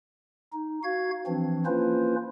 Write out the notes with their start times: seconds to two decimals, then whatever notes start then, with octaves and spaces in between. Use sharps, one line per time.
0.53 D#4
0.84 F#4 F5 G#6
1.27 E3 F3 C4 D4
1.66 A#3 C#4 E4 F4 B4 C5